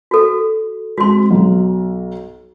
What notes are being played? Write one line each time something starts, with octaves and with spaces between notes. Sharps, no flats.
F#4 A4
G#3 C4 F#4 C6
B1 F#3